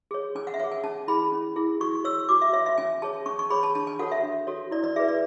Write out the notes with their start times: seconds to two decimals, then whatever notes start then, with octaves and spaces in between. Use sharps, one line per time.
0.11 G#4 C#5
0.35 C#4 G#5
0.47 F#5
0.54 E5
0.60 G#4 C#5 F#5
0.72 G#5
0.84 C#4 A5
1.08 E4 G#4 B5
1.32 C#4
1.56 E4 G#4
1.80 F#4 C#6
2.05 C#5 E6
2.29 F#4 D6
2.42 E5
2.53 C#5 E5
2.66 E5
2.78 C#4 G#5
3.02 G#4 C#5 A5
3.26 C#4 C#6
3.39 C#6
3.50 G#4 C#5 B5
3.63 A5
3.75 D4 A5
3.87 G#5
3.99 F#4 A4 C#5 F#5
4.12 E5
4.23 D4
4.47 F#4 A4 C#5
4.71 E4 D5
4.84 D5
4.96 G#4 B4 E5
5.08 D5